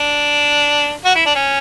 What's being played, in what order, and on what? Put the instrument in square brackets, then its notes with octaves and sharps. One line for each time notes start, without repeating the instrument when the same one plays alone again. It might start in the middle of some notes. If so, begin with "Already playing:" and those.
Already playing: [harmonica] D4
F#4
E4
D4
C#4